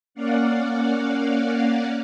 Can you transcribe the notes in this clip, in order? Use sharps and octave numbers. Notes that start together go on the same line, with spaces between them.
A#3 C#4 D5 F5 F#5